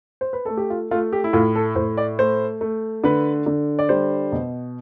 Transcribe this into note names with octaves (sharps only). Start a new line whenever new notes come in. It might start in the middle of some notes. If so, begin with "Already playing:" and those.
C5
B4
A3 A4
G4
F4
A3 F4
G4
E4
A2 F4
A4
A2 C5
D5
A3 C5
A3
D3 B4
D3
D5
G3 C5
B2